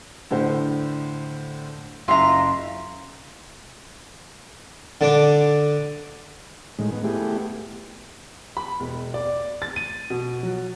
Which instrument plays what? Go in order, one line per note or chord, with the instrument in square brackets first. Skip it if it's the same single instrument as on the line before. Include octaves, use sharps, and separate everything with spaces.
[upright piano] A2 D3 C5
[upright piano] F#1 E5 [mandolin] F4 A#5
[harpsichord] D3 D4 D6
[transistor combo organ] A2 D#3 G#3
B3
A3 B3 E4 G4 G#4
[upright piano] B5
E1
D5
A6
D#7
B2
F#3